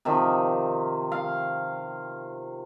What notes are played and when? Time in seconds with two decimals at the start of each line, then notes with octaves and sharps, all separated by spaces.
0.05 C3 D#3 F3
1.12 F5